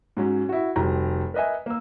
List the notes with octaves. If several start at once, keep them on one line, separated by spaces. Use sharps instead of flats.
G#2 F#3 C#4
E4 F#4
F1 F#3 G3 A#5
A#4 B4 D#5 E5 G#5
A#3 E6